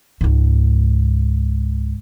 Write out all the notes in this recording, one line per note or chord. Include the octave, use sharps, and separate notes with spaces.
C#2 G#2